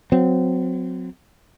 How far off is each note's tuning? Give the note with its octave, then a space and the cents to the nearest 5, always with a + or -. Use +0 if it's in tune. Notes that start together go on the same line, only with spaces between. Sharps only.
F#3 -20 C4 -30